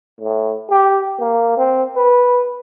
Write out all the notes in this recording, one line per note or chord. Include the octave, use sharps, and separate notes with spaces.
A2
G4
A#3
C4
B4